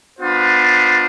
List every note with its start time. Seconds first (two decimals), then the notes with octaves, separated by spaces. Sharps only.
0.19 B3 D4 F4 C5